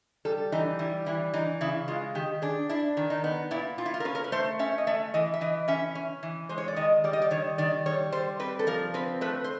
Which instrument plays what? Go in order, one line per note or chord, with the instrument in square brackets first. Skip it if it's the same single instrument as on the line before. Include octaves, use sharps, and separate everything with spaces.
[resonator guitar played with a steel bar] G3 A4
E3 D#4
G3 E4
E3 E4
E3 D#4
C#3 E4
G#3 F4
D#3 G4
D4 G#4
D4 E4
D#3
D#4
B3
A#2 E4
A#2 F4
E4
F4
A#4
C#4 B4
A#4
B4
A3 C5
C#4 E5
D#5
A3 E5
E3 D#5
E5
E3 D#5
C#4 E5
C#4
E3
G#3 C5
C#5
D5
D#3 D#5
G3 D5
D#5
D5
D#3 C#5
D#3 D5
G3 C#5
G3 C5
C4 B4
A4
F3 A#4
C4 B4
A3 B4
C5